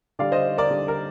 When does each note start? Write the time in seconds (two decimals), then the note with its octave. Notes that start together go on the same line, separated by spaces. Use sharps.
0.19 D3 G3 D5 F5
0.32 C5 D#5
0.58 A#4 D5
0.70 D3 G3
0.88 A#4